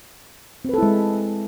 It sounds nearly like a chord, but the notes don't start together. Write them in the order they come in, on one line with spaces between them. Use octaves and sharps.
C4 B4 A4 E4 G#3